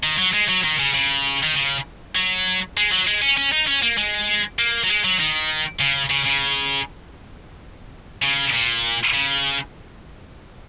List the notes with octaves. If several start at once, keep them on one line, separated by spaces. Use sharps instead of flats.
D#3
F#3
G#3
F#3
D#3
C#3
C#3
D#3
C#3
F#3
G#3
F#3
G#3
C#4
C#4
D#4
C#4
A#3
G#3
A#3
F#3
G#3
F#3
D#3
C#3
C#3
C#3
C#3
A#2
C#3